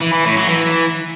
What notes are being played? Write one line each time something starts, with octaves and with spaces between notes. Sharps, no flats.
E3
E3
A2
F#3
E3